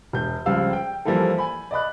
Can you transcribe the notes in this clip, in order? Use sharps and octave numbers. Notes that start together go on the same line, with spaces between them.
E1 G6
C#2 F3 G3 F5 E6
G5
E3 F3 G3 A#3 E4 A4
G#5 B5
D5 D#5 B5 F#6